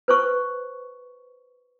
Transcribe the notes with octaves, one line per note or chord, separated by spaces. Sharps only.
B4 C5 C#6